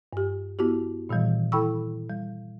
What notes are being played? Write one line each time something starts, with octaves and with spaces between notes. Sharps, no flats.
G2 G4
B3 E4 F#4 G4
A#2 D#3 E3 G3
E4 A4 G5 B5 C#6 E6
G3